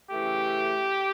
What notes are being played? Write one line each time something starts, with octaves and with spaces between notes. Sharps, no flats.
C#3 E3 A3 G4